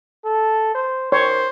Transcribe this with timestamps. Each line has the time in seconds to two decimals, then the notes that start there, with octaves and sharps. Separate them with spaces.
0.25 A4
0.75 C5
1.12 D#3 C5 C#5